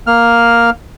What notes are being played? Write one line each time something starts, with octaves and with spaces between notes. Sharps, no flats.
A#3 F6